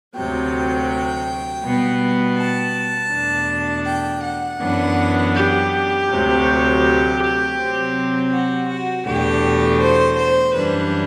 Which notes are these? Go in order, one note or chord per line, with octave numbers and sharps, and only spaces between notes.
D2 C3 F#3 G5
B2 G3 B3
A5
E2 B2 A3 D4
G5
F#5
F#2 E3 B3 D4
G4
D2 C3 F#3
C3 F#3 C4
F#4
F#4
E2 B2 A3 D4 G4
C5
C5
F#2 E3 G3 D4 B4